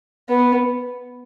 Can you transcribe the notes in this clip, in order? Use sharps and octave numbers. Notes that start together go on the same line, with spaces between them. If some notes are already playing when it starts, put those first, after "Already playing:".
B3